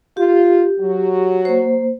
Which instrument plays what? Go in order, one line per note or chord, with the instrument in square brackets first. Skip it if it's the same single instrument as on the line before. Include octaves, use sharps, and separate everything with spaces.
[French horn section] F4 [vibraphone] G4
[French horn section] F#3 F#4
[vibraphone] A#3 C5